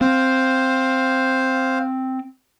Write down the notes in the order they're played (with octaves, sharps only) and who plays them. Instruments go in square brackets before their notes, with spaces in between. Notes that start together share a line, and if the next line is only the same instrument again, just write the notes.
[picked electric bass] C4 [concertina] C5 F5